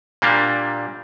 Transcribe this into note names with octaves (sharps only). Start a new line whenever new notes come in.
A#2 G3 A#3 D4 G4